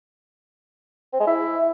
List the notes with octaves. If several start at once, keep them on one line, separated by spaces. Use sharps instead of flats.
C4
G#3
E4